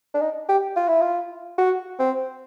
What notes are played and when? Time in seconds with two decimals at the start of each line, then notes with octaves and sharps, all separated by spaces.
0.14 D4
0.21 D#4
0.49 G4
0.77 F4
0.88 E4
1.01 F4
1.58 F#4
1.99 C4